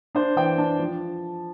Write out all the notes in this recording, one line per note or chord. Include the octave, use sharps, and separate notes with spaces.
D4 C5
E3 G5
D4 A5
F3